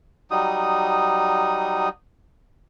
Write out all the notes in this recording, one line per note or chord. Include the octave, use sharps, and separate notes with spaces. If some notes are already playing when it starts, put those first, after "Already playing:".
F#3 G3 D#4 D#6